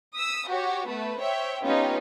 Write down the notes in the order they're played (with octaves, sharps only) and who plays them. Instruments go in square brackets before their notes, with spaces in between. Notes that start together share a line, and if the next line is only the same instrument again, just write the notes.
[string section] D#6 E6 B6
F#4 G4 C#5
A3 B3 B4
C5 C#5 E5 G5
B3 C#4 D#4 F4 G4 B4